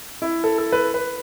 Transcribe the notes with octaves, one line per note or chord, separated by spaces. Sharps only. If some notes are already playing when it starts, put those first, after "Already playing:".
E4
A4
A4
B4
B4